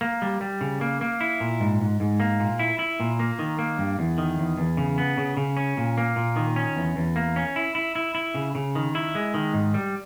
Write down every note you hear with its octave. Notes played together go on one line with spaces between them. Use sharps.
A#3
G3
G3
C#3
A#3
A#3
E4
A#2
G#2
G#2
G#2
A#3
A#2
E4
E4
A#2
A#3
D#3
A#3
G2
E2
D#3
E2
E2
C#3
B3
C#3
C#3
C#4
A#2
A#3
A#2
D#3
C#4
E2
E2
A#3
C#4
E4
E4
E4
E4
C#3
C#3
D#3
E4
G#3
D#3
G#2
G3